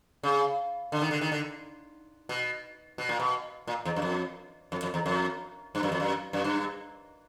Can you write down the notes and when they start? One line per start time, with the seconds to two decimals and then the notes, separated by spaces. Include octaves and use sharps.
0.23 C#3
0.92 D3
1.02 D#3
1.11 D3
1.21 D#3
1.32 D3
2.29 B2
2.98 B2
3.09 A#2
3.20 B2
3.67 A#2
3.85 E2
3.96 F#2
4.02 F2
4.72 F2
4.83 F2
4.94 E2
5.06 F2
5.75 G2
5.83 F#2
5.92 F2
6.00 F#2
6.33 F#2
6.44 G2